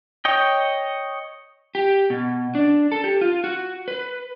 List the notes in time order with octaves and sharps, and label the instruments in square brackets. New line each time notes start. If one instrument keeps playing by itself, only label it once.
[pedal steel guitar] C#5 D#5 G5
[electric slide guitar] G4
B2
D4
A4
G4
F4
F#4
B4